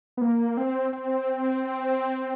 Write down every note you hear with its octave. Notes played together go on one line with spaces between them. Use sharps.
B3
A#3
C4
C4